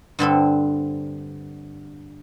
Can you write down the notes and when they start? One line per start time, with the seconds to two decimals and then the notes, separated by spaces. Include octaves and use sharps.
0.19 G2 D3 C4 A4